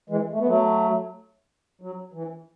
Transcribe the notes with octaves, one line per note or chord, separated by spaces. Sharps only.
E3 G#3
A3
B3
F#3 A3
F#3
E3